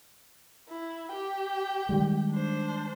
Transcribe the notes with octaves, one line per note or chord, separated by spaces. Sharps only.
E4
G4 G5
D#3 G3 G#3
D4 C5